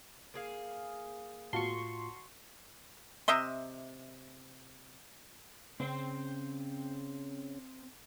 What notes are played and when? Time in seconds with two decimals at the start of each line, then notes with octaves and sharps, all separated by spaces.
0.34 A#3 G#4 F5
1.53 A2 F4 F#4 A5 C6 C#6
3.28 C3 D#5 E5 C6
5.80 C#3 C4 C5